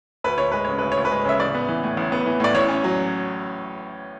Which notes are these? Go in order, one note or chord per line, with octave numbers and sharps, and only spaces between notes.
D2 B4
D2 C#5
G#3 B4
C#3 C#5
D2 B4
C#5
D2
B4
G#3
C#3 E5
A1 D5
B3
E3
A2
A1
B3
E3
A2 D5
A1 C#5
C#4
F#3